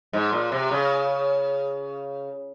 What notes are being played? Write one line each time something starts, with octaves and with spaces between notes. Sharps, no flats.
G#2
A#2
C3
C#3